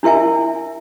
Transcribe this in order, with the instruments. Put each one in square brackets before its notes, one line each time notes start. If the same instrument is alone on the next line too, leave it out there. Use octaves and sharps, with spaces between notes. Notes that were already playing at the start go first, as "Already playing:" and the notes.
[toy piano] D4 E4 A#4 E5 G#5